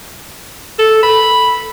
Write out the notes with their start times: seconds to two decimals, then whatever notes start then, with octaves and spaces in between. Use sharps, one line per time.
0.79 A4
1.03 B5